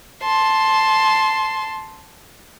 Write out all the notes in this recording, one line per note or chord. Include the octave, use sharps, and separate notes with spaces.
A5 C6